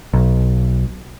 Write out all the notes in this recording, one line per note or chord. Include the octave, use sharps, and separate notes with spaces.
B1